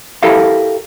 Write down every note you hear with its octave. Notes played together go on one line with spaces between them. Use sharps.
E4 G4 A4 A#4 E5 F5